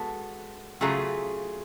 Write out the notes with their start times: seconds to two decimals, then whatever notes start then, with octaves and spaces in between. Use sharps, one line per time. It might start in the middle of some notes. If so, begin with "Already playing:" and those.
Already playing: G#3 B3 F#4 A4
0.81 C#3 F#3 A3 F4 G#4